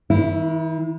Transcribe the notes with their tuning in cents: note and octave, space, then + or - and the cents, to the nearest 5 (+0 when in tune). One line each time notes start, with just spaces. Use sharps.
D#3 +45 E4 +0